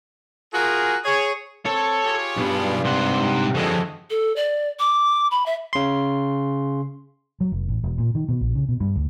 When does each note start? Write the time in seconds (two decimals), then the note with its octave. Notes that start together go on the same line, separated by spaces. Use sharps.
0.53 F4 F#4 G#4 A#4
1.05 G#4 C#5
1.66 C4 A4 C#5
2.05 F4 G4 G#4
2.37 B1 G2 B3
2.85 G#2 C3 F#5 C6
3.55 D3 F3 G#3 E4 F#4 A4 D#5
4.10 A4
4.36 D5
4.79 D6
5.31 B5
5.46 E5
5.73 C#3 C6
7.41 F#3
7.52 F1
7.68 A1
7.83 E1
7.98 A#2
8.15 D#3
8.29 B2
8.41 A#1
8.55 C#3
8.69 B2
8.81 G2
8.96 D2